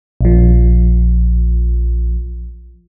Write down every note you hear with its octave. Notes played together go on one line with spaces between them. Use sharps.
A#1 F3